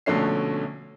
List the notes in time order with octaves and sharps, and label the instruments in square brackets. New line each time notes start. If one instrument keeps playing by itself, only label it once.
[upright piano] A#1 B2 D3 A3 C#4 C7